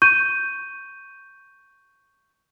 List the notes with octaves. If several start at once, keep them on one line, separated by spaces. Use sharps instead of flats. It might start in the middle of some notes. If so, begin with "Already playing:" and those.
C#6 G6 D#7